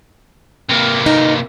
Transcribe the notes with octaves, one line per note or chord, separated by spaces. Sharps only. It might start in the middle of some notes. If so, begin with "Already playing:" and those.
C3 A#3
D#4